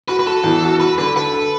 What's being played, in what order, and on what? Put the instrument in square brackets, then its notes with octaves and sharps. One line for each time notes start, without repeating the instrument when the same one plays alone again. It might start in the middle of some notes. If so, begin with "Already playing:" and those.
[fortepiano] F#4 [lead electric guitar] B4
[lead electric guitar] B4
[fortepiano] F#4 [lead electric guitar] A4
[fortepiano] E2
F#4
[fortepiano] F#4 [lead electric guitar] B4
[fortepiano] D3 [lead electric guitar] B4
[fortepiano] A4 [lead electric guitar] B4
[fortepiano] A4